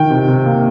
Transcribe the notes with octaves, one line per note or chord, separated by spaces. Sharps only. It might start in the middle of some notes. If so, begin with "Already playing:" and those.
Already playing: D#3 G5
C3
C3
A#3